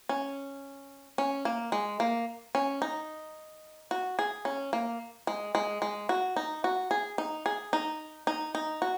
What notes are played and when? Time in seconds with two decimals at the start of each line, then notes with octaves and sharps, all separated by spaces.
0.09 C#4
1.18 C#4
1.45 A#3
1.72 G#3
2.00 A#3
2.55 C#4
2.82 D#4
3.91 F#4
4.19 G#4
4.45 C#4
4.73 A#3
5.27 G#3
5.55 G#3
5.82 G#3
6.09 F#4
6.36 D#4
6.64 F#4
6.91 G#4
7.18 D#4
7.46 G#4
7.73 D#4
8.27 D#4
8.55 D#4
8.82 F#4